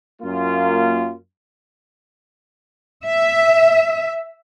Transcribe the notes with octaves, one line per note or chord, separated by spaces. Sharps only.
F#2 A#3 F4
E5